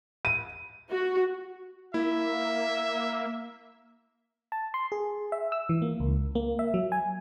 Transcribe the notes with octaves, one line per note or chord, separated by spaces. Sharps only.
D#7
F#4
A#3 E4 E5
A5
C6
G#4
E5
E6
E3
A#3
C#2
A#3
E5
F#3
G#5